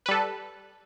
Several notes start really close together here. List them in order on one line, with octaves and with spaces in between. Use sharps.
B4 G3 A4